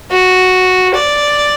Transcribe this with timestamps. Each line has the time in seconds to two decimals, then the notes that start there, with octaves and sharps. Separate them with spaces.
0.11 F#4
0.94 D5